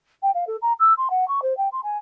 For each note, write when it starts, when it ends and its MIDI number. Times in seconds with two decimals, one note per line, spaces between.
0.22 0.31 79
0.34 0.44 77
0.47 0.56 69
0.62 0.73 82
0.79 0.93 88
0.97 1.08 84
1.10 1.27 78
1.28 1.40 85
1.42 1.56 72
1.57 1.68 79
1.72 1.80 84
1.83 1.97 80